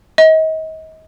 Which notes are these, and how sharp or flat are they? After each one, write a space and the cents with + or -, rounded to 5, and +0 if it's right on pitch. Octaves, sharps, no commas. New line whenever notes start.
D#5 +35